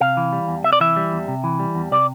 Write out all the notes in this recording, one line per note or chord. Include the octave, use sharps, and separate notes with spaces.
C3 F5
E3
G3
E2
C3 E5
D5
E3 E5
G3
E2
C3
E3
G3
E2
C3 D5